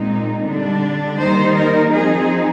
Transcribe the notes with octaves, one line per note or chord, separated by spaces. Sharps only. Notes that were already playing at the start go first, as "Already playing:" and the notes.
Already playing: A#2 G#3 C4 D#4
D3 G3 D4
D#3 G3 A#3 D#4 C5
A#4
F3 C4 D#4 G#4